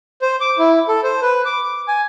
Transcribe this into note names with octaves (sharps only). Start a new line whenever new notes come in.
C5
D6
E4
A4
C5
B4
D6
D6
G#5